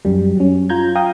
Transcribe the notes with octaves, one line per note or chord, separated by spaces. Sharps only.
F#2 G3
F#3 C#4
F4 A#5 G6 G#6
F5 G5 A#5 D#6